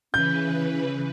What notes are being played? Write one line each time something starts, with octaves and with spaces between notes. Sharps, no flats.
C#3 E3 C#4 B4 G6